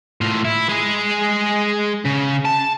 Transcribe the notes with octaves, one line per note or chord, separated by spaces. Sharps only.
A2 F4
E4
G#3 G#4
C#3
A5